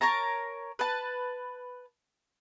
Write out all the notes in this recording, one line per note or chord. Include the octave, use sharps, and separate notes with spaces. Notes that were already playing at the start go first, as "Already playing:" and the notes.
A#4 C#5 A5 A#5
B4 A5